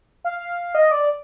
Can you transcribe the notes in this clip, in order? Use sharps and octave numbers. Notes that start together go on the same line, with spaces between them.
F5
D#5
D5